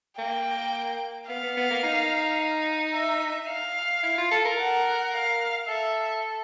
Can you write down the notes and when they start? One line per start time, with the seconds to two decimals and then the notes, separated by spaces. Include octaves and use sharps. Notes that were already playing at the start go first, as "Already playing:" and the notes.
0.18 A#3 G5
1.28 B3 F5
1.43 B3
1.57 B3
1.71 A#3
1.83 D#4
2.94 E5
3.49 F5
4.03 E4
4.18 F4
4.31 A4
4.45 A#4
4.59 F#5
5.13 F5
5.68 A4 E5